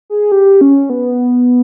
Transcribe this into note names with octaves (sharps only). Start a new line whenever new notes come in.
G#4
G4
C#4
B3